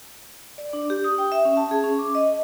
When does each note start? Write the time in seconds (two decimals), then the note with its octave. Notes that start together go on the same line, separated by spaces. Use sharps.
0.58 D5
0.73 D4
0.90 G4
1.04 D#6
1.18 G5
1.32 E5
1.45 C#4
1.57 A5
1.71 G#4
1.84 C#4
1.99 D6
2.15 D#5